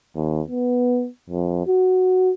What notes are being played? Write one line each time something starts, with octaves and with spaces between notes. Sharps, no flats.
D#2
B3
F2
F#4